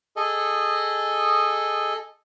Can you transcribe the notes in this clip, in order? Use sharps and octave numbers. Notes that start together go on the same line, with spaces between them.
G#4 A4 D#5